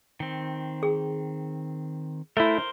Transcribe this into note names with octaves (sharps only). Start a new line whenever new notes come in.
D#3 C4
G#4
A3 E4 A#4 C5